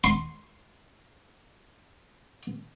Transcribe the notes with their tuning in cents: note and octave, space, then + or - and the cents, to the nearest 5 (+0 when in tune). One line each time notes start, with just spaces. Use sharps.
C6 +0